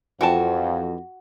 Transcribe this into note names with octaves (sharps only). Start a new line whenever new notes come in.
F2 E3 F3 F#4 G5 A5